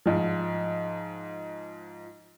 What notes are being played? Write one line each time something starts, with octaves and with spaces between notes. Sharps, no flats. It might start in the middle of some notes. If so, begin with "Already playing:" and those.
G#2 F3